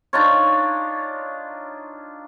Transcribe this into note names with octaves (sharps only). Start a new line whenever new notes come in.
D4 D#4 F4 C#5